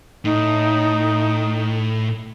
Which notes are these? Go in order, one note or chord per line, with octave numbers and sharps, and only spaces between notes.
A2 D#4